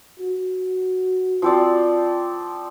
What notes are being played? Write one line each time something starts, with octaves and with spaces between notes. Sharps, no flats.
F#4
F3 C4 D5